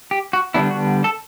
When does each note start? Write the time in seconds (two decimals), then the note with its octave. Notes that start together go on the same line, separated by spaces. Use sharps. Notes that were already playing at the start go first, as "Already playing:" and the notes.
0.11 G4
0.33 F#4
0.54 D3 G3 B3 D4 E4
0.71 F#4
1.04 A4